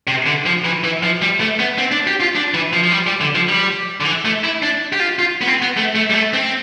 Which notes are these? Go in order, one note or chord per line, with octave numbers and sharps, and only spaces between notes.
C3
D3
F3
E3
E3
F3
G3
A3
B3
C4
D4
G4
F4
D4
E3
F3
F3
G3
G3
D3
F3
G3
D3
E3
A3
E4
D4
G4
F4
F4
B3
C4
B3
A3
A3
G3
A3
C4